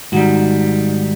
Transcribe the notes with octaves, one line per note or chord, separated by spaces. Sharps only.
G#2 D#3 G3 F#4